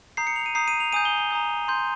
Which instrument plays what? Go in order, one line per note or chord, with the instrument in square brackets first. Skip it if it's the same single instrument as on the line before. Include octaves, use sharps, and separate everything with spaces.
[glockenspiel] A#5 D#6 G6 C7
C#7
F7
D#7
A#5 D#6 G6 C7
D#7
F7
G#5 D#6 G6 D#7
G7
G7
A#5 D#6 G6
C6 G6